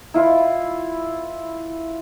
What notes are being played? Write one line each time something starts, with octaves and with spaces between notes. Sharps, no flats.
E4 F4 B4